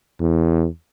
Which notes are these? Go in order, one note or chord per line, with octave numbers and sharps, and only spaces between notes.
E2